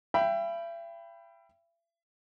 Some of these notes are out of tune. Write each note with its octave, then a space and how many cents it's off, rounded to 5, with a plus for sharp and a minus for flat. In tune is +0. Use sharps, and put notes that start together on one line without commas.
E5 +40 G5 +0 B5 +0